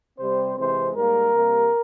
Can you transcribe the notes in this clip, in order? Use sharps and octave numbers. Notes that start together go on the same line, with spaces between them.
C3 G3 C4 C5
C3 E3 G#3 C4 C5
G#2 G3 A#3 A#4
C3 G3 A#3